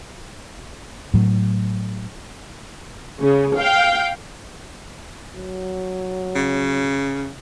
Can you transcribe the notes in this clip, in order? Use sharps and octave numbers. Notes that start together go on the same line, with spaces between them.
A2 F#3
C#3
F5 G5
F#3
C#3